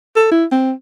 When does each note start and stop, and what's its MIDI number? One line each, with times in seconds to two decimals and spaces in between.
0.16 0.27 69
0.31 0.45 64
0.52 0.72 60